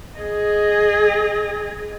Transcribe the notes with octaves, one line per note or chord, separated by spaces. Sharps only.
G#4 D#5